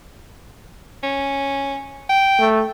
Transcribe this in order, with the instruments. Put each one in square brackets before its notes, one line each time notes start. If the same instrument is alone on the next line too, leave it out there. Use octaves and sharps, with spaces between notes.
[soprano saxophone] C#4
G5
[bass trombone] A3